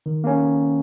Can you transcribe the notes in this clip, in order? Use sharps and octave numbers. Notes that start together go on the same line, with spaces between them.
D#3
A#3 C#4